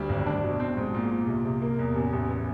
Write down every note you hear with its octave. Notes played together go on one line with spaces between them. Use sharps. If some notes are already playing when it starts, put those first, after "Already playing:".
Already playing: D2 G3
G#1
D4
B2
C4
G#2
A#2
A#2
C2
C2
A#3
E2
A1
A1
B3